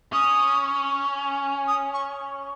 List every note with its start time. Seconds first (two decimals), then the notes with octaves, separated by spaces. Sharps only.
0.13 C#4 D#6
1.67 D#6
1.93 C#6